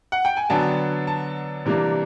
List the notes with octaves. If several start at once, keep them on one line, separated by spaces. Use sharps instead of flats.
F#5
G5
G#5
D3 F#3 B3 D4 A5
A5
C3 E3 G3 A#3 D4